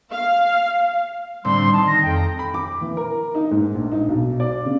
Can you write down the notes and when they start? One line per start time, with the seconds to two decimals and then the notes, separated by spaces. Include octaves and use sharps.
0.12 F5
1.45 A2 D3 G3 C4 C6
1.73 D#3 A5
1.87 A#6
2.03 F2 G5
2.16 A#5
2.39 B5
2.54 D6
2.81 E3
2.97 A#4
3.35 D#4
3.51 G#2
3.74 A#1
3.92 D#4
4.09 B1
4.40 D5
4.65 C#3